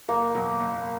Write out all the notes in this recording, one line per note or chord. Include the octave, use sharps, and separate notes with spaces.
F#1 A#3
E2 B2 F#3
F#1